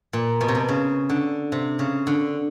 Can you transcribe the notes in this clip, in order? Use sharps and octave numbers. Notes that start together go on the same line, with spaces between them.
A#2
B2
C3
B2
C#3
D3
C3
C#3
D3